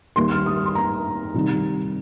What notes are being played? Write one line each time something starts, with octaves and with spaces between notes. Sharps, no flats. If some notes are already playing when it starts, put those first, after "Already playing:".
D#2 D#3 G3 D#4 C6
F6
D#6
C6
A#5
C3 D#3 G3